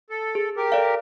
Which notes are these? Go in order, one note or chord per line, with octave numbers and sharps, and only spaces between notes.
A4
G#4
G4 A#4
A4 D5 F5